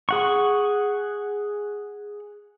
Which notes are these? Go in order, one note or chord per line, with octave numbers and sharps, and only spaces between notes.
G#4 F#5 C#6